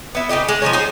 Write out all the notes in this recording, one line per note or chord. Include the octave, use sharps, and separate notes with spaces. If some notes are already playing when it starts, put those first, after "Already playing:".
B3 E4
C#3 D#4 G4 D#5
G#3
F3 G3 D#4 C#5
D#4 G#4 C5